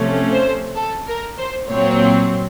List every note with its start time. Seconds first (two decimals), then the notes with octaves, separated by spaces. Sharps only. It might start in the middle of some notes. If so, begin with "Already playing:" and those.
Already playing: C3 F3 A3 C#4
0.32 C5
0.76 A4
1.08 A#4
1.38 C5
1.68 A#2 F#3 C4 C#5